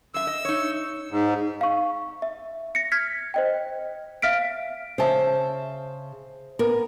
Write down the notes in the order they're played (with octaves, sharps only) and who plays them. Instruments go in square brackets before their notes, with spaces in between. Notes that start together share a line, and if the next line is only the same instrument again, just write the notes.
[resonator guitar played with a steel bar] F#2 E5 [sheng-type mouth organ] E6
[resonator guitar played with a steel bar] D#5
D#4 C#5
[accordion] G#2
[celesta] F5 C#6
E5
A#6 C#7
F6 G#6 B6
C5 D#5 G5
E5 F5 F6 B6 D7
[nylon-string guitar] C#3 A5 [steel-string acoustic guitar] C5 E5
[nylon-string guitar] B3 A#4